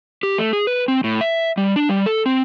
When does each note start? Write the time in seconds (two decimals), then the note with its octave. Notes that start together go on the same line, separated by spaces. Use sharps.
0.23 G4
0.38 A3
0.53 G#4
0.67 B4
0.88 C4
1.04 A2
1.21 E5
1.57 G3
1.76 D4
1.89 G3
2.06 A4
2.26 C4